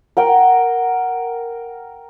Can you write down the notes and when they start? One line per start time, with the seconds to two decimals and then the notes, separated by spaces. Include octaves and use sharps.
0.17 A#4 F#5 G5